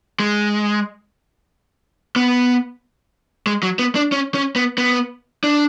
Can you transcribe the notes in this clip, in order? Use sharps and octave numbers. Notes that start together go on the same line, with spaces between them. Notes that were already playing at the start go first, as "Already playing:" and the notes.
G#3
B3
G#3
F#3
B3
D4
C#4
C#4
B3
B3
D4